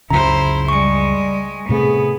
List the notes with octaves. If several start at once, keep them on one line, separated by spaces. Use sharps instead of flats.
C#2 F#2 C#3 E4 C5 A#5
G3 G#3 C#6 C#7
A2 C3 A3 B3 G#4